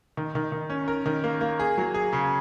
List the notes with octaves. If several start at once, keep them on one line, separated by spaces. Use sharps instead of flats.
D#3
D#3
D#3
C#4
A#4
D#3
A#3
A#3
G#4
F#3
G#4
C#3